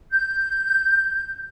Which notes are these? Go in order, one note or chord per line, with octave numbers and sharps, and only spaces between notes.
G6